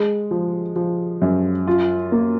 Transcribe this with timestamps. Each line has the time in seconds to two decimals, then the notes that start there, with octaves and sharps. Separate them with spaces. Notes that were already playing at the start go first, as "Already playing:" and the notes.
Already playing: G#3
0.31 F3
0.76 F3
1.22 F#2
1.67 F4
2.12 A#3